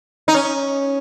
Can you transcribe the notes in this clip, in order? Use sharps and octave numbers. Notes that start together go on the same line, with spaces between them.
D#4
C#4